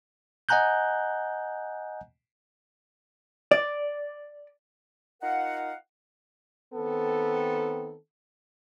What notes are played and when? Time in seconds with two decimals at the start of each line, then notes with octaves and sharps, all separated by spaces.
0.49 D#5 F#5 G#5 A#5 F#6 G6
3.51 D5
5.22 D#4 F4 A#4 F5 F#5
6.74 D#3 B3 C4 A4